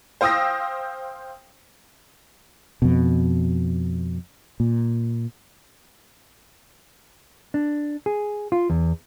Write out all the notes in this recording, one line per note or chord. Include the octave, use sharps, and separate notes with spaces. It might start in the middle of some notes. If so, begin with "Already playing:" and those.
C5 F5 G5 D#6 E6 A#6
F2 B2
A#2
D4
G#4
F4
E2